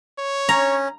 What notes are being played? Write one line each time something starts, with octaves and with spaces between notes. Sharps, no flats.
C#5
C#4 A#5